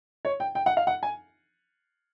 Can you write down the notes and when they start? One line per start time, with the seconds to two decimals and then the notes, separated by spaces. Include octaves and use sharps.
0.25 C#5
0.40 G5
0.55 G5
0.66 F#5
0.77 F5
0.87 F#5
1.03 G#5